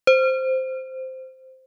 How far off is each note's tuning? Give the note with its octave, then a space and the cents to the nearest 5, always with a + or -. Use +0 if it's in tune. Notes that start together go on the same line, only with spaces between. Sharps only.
C5 -5